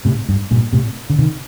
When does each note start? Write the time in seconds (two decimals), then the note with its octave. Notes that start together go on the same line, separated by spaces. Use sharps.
0.05 A2 C3
0.29 G2
0.51 G2 A#2
0.73 A2 C3
1.10 D3
1.19 C3 D#3